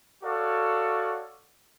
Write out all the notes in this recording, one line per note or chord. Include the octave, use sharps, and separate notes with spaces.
F#4 A4 C#5 D5 F5 F#5